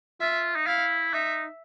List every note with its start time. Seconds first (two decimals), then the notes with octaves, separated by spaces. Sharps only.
0.21 F4 E5
0.55 D#4
0.66 E4 F5
1.14 D#4 E5